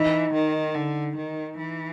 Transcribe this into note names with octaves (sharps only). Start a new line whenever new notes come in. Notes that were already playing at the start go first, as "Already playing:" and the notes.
Already playing: E3 D#4
D#3
D3
D#3
E3